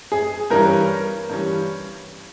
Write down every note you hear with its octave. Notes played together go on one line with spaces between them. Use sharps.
G#4
G2 E3 G3 C#4 A#4
G2 E3 G3 C#4